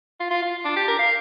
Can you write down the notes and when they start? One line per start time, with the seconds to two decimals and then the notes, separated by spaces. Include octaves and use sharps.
0.20 F4
0.31 F4
0.42 F4
0.65 D4
0.76 G4
0.88 A#4
0.99 F5